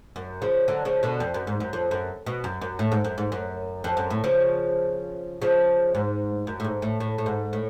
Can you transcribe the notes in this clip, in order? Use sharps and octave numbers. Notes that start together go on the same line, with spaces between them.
F#2
C#3 F3
D3 F#3
C#3 F3
B2 D3
F2
F#2
G#2
F#2
F2
F#2
B2
F#2
F#2
A2
G#2
F#2
G#2
F#2
F2
F#2
A2
C#3 F3
C#3 F3
G#2
F#2
A2
G#2
A2
A2
A2
G#2
A2